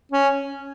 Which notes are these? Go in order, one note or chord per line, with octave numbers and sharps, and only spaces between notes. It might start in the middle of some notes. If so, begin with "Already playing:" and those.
C#4